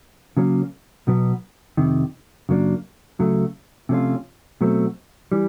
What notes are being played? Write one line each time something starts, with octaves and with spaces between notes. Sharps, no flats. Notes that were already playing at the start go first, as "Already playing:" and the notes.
C#3 F#3 A#3 C#4
B1 B2 F#3 B3
F2 C3 D#3
F#2 C#3 F#3 A#3 D4
C#2 C#3 F#3 A3
C3 F3 A3 C#4 F4
B2 F#3 A3 C4
E3 G3